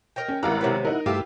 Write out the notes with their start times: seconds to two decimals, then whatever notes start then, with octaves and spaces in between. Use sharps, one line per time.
0.16 A#4 D#5 G5
0.28 C#4
0.43 G#1 G3 B3 E4 A#4 F5 F#5 A#5
0.61 C3 F#3 B3
0.85 D#4 E4 A#4 F#5
1.06 G2 A3 E4 F4 G4 B4 F5 E6